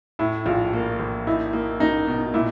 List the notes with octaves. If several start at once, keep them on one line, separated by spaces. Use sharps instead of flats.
A2 E4
A#1 F4
A#3
A#1
D#4 E4
A#3
A#3 D#4
B2
A#2 E4